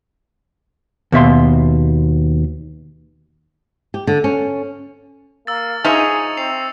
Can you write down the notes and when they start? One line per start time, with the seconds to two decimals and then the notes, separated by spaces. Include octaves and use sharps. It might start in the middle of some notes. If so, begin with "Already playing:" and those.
1.12 D#2 B2 E5 C6
3.94 G4
4.07 D3
4.24 C#4
5.47 A#3 E6 A6
5.85 F3 D#4 G#4 E5 C#6 C#7 F7
6.37 C4 C7 F7